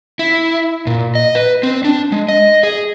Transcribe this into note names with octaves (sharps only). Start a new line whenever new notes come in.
E4
A#2
D#5
B4
C4
D4
G#3
D#5
G#4